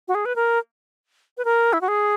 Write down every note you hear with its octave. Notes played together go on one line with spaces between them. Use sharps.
F#4
G#4
B4
A#4
B4
A#4
E4
F#4
G#4